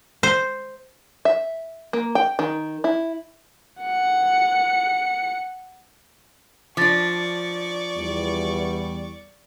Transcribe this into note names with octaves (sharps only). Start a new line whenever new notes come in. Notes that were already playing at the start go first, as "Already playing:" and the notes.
C5
E5
A#3
G5
D#3
E4
F#5 C#7
F3 D4 D5 C#6 D6 A6
E2 G3